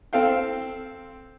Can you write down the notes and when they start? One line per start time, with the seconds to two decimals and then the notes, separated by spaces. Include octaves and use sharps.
0.13 C4 A4 F5 G5